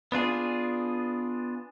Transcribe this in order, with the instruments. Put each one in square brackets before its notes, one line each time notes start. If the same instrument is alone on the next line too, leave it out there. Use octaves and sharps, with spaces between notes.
[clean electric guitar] B3 D4 F4 G#4